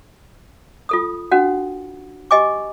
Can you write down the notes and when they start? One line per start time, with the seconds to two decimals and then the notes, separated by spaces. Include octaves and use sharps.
0.89 F4 A4 D#6
1.31 C#4 D4 F#4 F#5
2.31 G4 D#5 G#5 D6